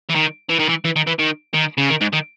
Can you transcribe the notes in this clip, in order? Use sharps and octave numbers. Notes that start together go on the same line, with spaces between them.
E3
D#3
E3
D#3
E3
E3
D#3
E3
D#3
D#3
C#3
D#3
G#2
D#3